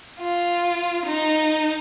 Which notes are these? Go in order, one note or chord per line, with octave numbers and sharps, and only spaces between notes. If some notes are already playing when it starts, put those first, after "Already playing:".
F4
D#4